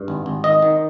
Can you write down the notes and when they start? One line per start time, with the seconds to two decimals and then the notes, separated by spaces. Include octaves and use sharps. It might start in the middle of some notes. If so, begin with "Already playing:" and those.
Already playing: G2
0.08 G#1
0.26 G#1
0.44 D#3 D#5
0.62 D#3